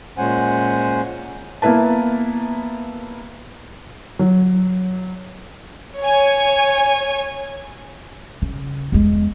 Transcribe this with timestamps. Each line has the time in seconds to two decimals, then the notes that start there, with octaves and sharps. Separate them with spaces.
0.18 A#2 G#3 C#4 C5 F#5 G#5
1.62 A#3 B3 E4 B4 A5
4.19 F#3
6.00 C#5 G#5
8.42 C#3
8.92 E2 G#3